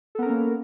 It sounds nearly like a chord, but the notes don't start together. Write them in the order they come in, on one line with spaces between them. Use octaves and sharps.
A4 B3 A#4 C#4 A#3